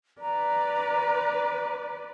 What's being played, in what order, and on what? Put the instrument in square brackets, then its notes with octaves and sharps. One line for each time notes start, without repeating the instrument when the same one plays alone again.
[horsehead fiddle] B4 D5 [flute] A#5